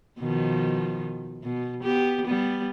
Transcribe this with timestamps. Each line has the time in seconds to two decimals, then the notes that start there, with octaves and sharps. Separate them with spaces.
0.19 B2 D#3 F3
1.43 B2
1.83 B3 G4
2.25 G3 B3